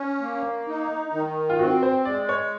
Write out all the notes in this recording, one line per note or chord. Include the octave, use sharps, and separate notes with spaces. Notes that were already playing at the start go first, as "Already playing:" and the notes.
Already playing: C#4
A#3
D#4
D#3
F4
C4 F#4
C5
G#3 D5
C#5